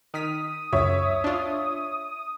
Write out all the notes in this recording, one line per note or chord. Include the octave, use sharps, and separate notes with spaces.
D#3 D#6 F6 B6
C#2 F#2 C#5 E5
D4 F4